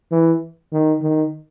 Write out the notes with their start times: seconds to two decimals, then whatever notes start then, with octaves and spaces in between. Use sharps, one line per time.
0.12 E3
0.72 D#3
1.02 D#3